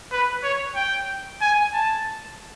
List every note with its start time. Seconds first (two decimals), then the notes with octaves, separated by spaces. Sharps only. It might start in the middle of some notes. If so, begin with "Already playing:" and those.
0.11 B4
0.43 C#5
0.76 G5
1.41 G#5
1.74 A5